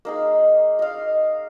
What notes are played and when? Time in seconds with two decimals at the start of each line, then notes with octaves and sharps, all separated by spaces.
0.05 A#3 D#4 G#4
0.79 D#5 F5